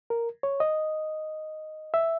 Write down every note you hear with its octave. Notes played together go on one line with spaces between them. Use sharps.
A#4
C#5
D#5
E5